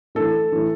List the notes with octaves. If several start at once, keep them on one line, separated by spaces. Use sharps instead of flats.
A2 E3 A4
A2 E3